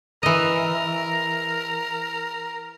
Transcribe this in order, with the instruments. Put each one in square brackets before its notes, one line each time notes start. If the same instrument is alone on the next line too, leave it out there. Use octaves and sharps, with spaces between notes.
[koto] E3 D#5 [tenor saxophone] A#4